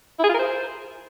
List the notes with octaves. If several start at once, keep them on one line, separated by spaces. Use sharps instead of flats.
E4
G#4
F4
A#4
C5